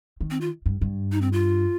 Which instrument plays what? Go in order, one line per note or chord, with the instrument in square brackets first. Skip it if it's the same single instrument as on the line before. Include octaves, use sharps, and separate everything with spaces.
[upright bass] D#3
[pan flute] C4
F4
[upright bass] G2
G2
[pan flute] D#4
C4
F4